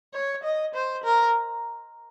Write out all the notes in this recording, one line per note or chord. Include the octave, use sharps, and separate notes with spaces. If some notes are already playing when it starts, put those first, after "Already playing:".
C#5
D#5
C5
A#4